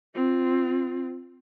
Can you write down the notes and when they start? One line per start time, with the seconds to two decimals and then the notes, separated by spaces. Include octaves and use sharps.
0.15 C4 F4